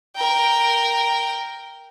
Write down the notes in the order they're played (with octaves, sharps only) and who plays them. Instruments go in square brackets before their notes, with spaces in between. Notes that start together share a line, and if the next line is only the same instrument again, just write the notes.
[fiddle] A#4 G5